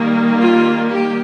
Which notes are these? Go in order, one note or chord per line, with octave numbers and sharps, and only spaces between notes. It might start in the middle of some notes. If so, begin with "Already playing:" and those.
Already playing: D#3 G3 A#3
F4
G4